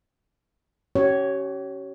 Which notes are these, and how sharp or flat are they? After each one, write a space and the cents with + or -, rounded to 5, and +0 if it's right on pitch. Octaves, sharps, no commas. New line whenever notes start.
C#4 +0 G4 -40 C#5 +0